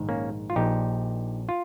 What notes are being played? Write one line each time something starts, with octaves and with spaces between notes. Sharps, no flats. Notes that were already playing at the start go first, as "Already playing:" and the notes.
Already playing: A#1 G#2 D#3
A#3 C#4
F4
A#1 A#2 D#4 G4
F4